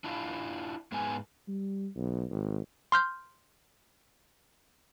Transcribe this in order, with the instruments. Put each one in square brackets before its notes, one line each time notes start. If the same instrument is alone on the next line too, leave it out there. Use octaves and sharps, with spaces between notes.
[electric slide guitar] D4 E4 F4
G#2 G#3 B3 D#4 G#5
[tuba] G3
B1
G#1
[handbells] C6 F6 G6